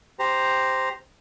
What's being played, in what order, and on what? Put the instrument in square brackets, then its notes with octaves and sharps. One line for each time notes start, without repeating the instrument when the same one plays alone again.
[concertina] G4 C5 A#5